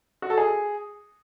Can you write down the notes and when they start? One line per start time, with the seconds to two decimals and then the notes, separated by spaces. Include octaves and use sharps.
0.22 F#4
0.30 A4
0.38 G#4